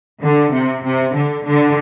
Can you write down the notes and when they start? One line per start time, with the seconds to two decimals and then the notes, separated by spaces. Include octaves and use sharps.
0.22 D3
0.52 C3
0.83 C3
1.14 D3
1.44 D3